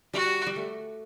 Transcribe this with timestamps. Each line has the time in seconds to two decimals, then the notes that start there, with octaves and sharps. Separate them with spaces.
0.13 G3 F#4
0.47 G3
0.56 A3